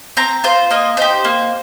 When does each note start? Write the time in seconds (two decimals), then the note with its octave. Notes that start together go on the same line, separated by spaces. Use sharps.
0.17 C4 A#5
0.44 F4 C5
0.71 A#3 D#5
0.97 D#4 G4 C5
1.24 A#3